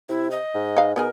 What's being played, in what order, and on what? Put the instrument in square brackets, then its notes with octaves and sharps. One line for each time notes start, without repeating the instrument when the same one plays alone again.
[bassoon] C3 [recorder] E4
[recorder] D#5
[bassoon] G#2
[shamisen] D#4 B4 F5
[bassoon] B2 [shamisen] B3 D#4 G#4 [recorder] A#4